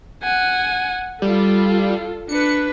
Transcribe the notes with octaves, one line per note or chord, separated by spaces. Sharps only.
F#5 G#5
G3 F4 A4
D4 B4 C#7